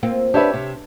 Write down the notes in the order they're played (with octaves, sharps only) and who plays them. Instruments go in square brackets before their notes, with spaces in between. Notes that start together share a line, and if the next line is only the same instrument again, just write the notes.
[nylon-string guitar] A#3 [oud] C4 F4
[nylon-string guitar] D4 B4 [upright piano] G4 C#5 E5
[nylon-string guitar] C3